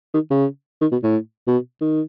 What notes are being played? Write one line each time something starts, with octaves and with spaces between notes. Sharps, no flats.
D#3
C#3
D#3
B2
A2
B2
D#3